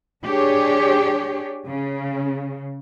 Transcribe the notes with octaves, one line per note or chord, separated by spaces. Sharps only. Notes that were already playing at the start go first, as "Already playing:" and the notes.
D4 G4 G#4 C#5
C#3